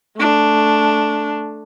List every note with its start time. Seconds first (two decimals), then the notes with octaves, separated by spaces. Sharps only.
0.17 A3 D4